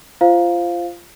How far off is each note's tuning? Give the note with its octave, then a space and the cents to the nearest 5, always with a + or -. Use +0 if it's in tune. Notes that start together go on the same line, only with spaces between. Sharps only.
F4 -20 C5 +0 F5 +0